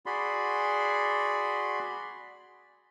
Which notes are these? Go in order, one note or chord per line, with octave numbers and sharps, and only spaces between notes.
F#4 G#4 D5 B5 C6